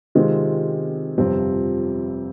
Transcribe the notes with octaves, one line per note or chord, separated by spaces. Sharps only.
C3 D#3 G#3 C4 F4
G1 F2 C3 F3 C4